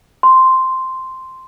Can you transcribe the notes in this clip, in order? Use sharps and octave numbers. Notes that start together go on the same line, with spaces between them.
C6